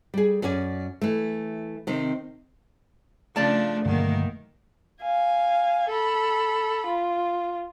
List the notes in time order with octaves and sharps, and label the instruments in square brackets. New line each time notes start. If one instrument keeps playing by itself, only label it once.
[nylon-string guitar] G3 G#4
F#2 C#4 D5 G#5
E3 A3
C3 D#3 C4
[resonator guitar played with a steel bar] C#3 D5 A5 [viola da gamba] F3 D4 [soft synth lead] A3
[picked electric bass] G2 D3 F#3 [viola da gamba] B2 D#3 A#3
[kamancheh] F5 G#5
A4 B5
F4